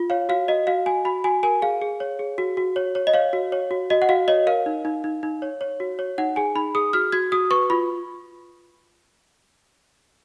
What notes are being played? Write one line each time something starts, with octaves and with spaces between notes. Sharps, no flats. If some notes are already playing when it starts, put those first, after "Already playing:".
Already playing: F4
C#5 F5
F#4 F5
F#4 D#5
F#4 F5
F#4 G#5
F#4 B5
F#4 G#5
A#4 G#5
G#4 F5
G#4
C#5
G#4
F#4
F#4
C#5
C#5
D#5
C#5 F5
F#4
C#5
F#4
F#4 D#5
F#5
F#4 F5
C#5 D#5
A#4 F5
D#4
D#4
D#4
D#4
C#5
C#5
F#4
C#5
D#4 F#5
G#4 G#5
D#4 B5
G#4 D#6
F#4 F6
F#4 G#6
F#4 D#6
B4 C#6
F4 B5